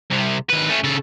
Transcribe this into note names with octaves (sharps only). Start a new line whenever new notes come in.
C2 C3
D#2 B4
A3 C#4
C#3 A4